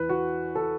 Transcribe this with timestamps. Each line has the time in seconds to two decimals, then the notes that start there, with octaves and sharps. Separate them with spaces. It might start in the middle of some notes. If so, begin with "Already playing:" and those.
Already playing: E2 E3 B4
0.09 F#4
0.55 A4